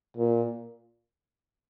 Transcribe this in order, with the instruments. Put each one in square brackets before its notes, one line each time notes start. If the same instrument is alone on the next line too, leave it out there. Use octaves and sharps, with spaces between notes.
[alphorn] A#2